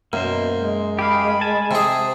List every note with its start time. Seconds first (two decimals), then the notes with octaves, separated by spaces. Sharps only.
0.13 F#2 B2 A#3 C5
0.56 G#3
0.99 G4 G#4 F5 B5
1.41 G#5 A5
1.71 C3 G#4 C5